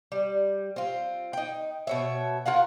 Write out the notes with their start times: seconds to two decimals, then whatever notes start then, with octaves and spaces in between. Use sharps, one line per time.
0.12 G3
0.76 C4 F4
1.33 D#4 G5
1.87 B2 C#5 E5
2.46 F4 A#4 F5 F#5